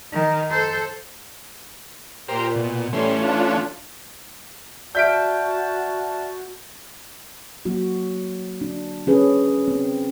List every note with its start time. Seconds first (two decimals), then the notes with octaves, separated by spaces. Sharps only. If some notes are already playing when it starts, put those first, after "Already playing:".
0.12 D#3
0.50 A4 C5
2.28 A#2 G4 A#4 C5
2.56 B2
2.93 A2 E3 G3 A3 C#4 C6
3.21 D4 F4
4.95 F#4 D5 E5 A5 F6 G6 B6 D7
7.65 F#3 A#3 F#4
8.61 D4
9.07 C#4 G#4 B4
9.68 C4